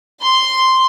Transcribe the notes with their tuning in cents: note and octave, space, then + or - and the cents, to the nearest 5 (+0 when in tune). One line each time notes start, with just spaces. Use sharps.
C6 -5